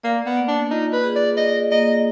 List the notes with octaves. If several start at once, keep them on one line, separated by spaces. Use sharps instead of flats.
A#3 D5
B3
A#3
D4
D#4 F4
B4
G#4
D5
D5 D#5
A#3 D#5